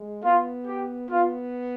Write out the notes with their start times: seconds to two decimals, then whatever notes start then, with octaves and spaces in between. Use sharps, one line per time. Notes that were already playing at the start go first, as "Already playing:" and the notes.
Already playing: G#3
0.23 B3 F4
0.66 G4
1.10 B3 F4